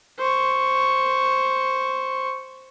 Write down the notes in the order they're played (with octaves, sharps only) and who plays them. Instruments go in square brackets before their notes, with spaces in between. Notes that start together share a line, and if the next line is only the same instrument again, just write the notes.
[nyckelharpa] C5 C#6